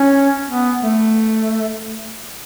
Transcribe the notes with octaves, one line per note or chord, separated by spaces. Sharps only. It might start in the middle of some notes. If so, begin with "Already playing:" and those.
Already playing: C#4
B3
A3